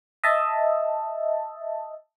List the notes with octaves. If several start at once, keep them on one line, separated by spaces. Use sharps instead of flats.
D#5 E5 A5